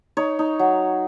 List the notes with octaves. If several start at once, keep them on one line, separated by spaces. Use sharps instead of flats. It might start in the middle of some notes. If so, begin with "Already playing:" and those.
D#4 C#5
D#4
F#3